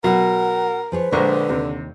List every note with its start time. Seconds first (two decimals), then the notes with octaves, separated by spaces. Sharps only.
0.04 B2 F#3 A#4 F#5
0.92 F3 G#4 B4 C#5
1.12 A#1 D3 G#3 A#4 C5 C#6
1.49 D#2 C3